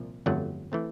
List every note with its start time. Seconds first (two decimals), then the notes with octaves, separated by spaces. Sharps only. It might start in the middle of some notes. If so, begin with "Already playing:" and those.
Already playing: C2 A#2 F3
0.26 G1 F2 D3 F#3 A3 F#5
0.72 E3 A3 C4